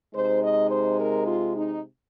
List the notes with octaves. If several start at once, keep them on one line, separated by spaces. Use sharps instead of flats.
C3 G#3 D#4 C5
D#5
C5
A#4
F4
D#4